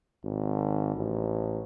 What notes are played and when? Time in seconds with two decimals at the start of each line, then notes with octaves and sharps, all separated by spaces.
0.24 G#1
0.96 A1